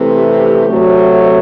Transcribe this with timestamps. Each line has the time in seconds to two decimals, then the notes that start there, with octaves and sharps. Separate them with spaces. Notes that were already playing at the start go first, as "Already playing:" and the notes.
Already playing: C3 E3 A3 C4
0.15 G4
0.67 D2 C3 F#3 A3